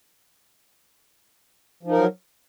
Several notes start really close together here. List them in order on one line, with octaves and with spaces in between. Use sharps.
F3 D#4 A#4 F#3